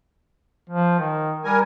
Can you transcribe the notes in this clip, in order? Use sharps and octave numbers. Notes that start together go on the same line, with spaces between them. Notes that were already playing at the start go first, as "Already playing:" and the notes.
F3
D#3
G3 A#4 G#5